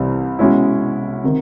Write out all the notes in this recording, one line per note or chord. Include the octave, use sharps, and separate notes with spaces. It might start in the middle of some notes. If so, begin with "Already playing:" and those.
Already playing: C2 C3 E3 G3
B2 G#3 C#4 E4
C3 D#3